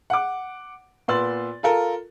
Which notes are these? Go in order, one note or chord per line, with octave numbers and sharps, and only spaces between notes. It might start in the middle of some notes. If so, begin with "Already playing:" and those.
F#5 D6
A#2 B3 C6 E6 A6 F#7
F4 A4 A#4